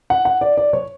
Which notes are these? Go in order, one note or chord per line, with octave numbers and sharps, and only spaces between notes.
F#5
F#5
D5
D5
C#5